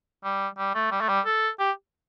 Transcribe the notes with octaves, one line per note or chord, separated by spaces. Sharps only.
G3
G3
A3
G3
A3
G3
A4
G4